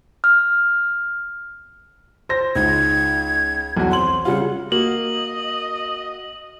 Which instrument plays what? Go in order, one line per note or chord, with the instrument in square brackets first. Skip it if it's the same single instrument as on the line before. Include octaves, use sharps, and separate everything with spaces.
[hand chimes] F6
[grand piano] C5 A#6
[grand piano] C#2 D#4 [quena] G#6
[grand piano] B1 E2 F#4
[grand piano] C4 F#7 [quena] C6
[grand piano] C#3 G3 F4 [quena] F#5
[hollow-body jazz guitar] A#3 [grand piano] F#4 [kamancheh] D#5 [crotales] F#7